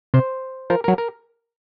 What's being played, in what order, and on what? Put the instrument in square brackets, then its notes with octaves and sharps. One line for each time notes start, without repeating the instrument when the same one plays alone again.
[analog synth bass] C3 [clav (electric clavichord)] C5
[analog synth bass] F3 [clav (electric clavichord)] A#4
[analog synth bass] F#3 [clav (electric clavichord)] A#4
[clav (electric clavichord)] A#4